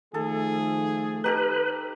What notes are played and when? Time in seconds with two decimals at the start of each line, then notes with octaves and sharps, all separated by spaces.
0.14 D#3 F3 A3 G#4 A4
1.24 D#4 G4 A4 B4